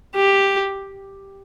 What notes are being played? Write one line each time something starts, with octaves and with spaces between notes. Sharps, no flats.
G4